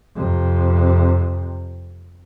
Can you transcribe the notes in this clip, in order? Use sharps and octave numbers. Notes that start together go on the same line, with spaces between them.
F2 C3